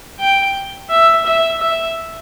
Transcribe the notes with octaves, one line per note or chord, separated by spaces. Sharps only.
G5
E5
E5
E5